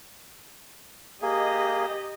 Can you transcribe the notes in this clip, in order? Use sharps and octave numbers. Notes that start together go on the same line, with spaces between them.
A#3 G4 G#4 D#5